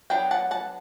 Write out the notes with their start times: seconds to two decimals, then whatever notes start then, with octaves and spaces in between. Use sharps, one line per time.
0.10 F#3 B3 D4 G5
0.31 F#5 A5
0.51 F#5 A5